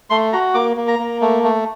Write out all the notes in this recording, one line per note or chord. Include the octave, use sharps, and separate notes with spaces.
A3 C6
F#4 A#5
A#3 D6
A#3
A#5
A#3
A3
A3